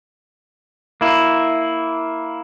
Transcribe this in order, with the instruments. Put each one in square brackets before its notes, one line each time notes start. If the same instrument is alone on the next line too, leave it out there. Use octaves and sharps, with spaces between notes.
[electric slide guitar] A#3 E4